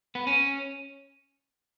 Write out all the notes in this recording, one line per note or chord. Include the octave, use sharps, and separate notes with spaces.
B3
C#4